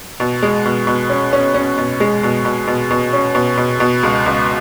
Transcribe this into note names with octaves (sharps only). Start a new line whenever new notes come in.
B2
G#3
B2
B2
C#4
C#4
C#4
B2
G#3
B2
B2
B2
B2
C#4
B2
B2
B2
C#2
C#2